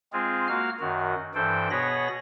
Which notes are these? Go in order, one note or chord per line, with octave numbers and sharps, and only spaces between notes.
G#3 C4 F4 G#4
A#3 F#4 F5 F6
F#2 D#3 F#4
G2 E3 A4 C5 G5
B2 B3 G#4 C#5 B5 A#6